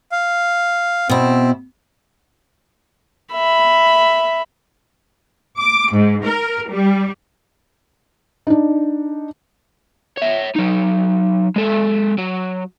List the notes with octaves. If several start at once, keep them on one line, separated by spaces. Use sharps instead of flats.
F5
B2 C4 E4
E5 B5
D6
G#2
A#4
G3
D4 D#4
C#5 E5
F#3 D#4
G#3 A4
F#3